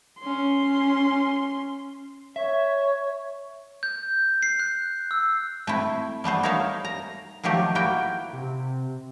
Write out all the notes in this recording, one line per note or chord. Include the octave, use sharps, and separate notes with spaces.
C#4 C6
C#5 E5
G6
C7
F#6
E6
A3 C4 E4
G3 A3 B3 C5
D#4 A#4 C#5 E5 F5
A#5
D#3 F3 F#3 A3 G4
A#3 E4 F#4 G5
C3